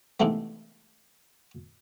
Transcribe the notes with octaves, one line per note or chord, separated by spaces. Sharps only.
C3 D#3 E3 G#3 A3 B3